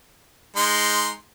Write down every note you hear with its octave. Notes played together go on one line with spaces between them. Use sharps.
G#3 D#4 C6